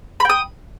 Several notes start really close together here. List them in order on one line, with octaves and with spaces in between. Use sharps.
B5 G5 D#6